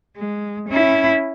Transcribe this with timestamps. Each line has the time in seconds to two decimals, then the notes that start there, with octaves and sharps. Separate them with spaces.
0.17 G#3
0.69 C#4 E4